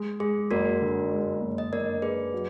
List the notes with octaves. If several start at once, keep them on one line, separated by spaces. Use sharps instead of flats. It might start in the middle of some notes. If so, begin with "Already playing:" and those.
Already playing: G#3
G#3 G#4
F#1 F#4 A#4
D3
G#3
F#1
D#5
F#1 A#4 D5
F#1 G#4 B4
F#3